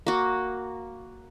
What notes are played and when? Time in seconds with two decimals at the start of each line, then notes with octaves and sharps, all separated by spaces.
0.07 A#3 F#4